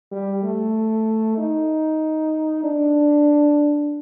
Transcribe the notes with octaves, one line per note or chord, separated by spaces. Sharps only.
G3
A3
D#4
D4